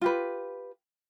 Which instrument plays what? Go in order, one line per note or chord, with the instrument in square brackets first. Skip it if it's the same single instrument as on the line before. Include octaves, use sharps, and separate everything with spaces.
[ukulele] F4 G4 B4